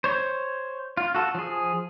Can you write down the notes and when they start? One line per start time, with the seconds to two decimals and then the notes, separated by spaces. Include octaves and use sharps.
0.04 C5 C#5
0.97 F4
1.15 F#4 A4
1.35 F3 G#4